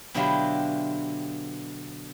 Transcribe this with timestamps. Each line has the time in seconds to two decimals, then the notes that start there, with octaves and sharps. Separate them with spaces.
0.14 B2 D3 F#3 E4 F4 G4